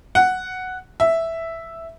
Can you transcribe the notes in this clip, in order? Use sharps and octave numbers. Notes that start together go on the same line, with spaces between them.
F#5
E5